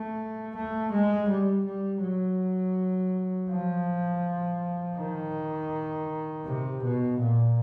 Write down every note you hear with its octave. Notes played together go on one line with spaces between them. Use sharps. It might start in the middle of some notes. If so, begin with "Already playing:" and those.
Already playing: A3
A3
G#3
G3
G3
F#3
F3
D#3
C3
B2
A#2